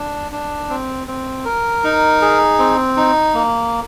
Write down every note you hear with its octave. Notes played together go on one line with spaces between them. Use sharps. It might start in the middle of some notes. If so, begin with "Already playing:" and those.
Already playing: D4
D4
C4
C4
A#4
D#4
G#4
C4
D#4
A#3